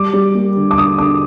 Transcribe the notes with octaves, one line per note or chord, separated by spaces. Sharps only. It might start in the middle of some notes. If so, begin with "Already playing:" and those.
Already playing: G3 D6
G3
A#3
D3
D6
D3 D#6
D3 D6